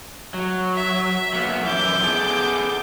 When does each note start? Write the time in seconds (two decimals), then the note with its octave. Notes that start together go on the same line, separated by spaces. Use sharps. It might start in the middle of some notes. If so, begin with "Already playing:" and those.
0.34 F#3
0.76 E5
1.33 F#3 A#3 B3
1.65 F#2 E3 D6 G6
2.01 B3 G#4 A4